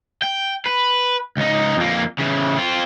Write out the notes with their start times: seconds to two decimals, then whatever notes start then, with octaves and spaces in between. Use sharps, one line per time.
0.22 G5
0.66 B4
1.37 C#2 D#4
1.77 F2 A#3
2.18 C#3 E3
2.58 C4 F4